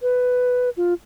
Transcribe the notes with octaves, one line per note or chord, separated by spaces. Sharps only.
B4
F4